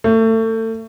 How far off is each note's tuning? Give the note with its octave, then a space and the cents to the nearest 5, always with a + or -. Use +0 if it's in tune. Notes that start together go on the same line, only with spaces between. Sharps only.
A3 +30